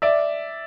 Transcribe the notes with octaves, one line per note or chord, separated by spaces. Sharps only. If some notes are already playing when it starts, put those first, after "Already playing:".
D5 E5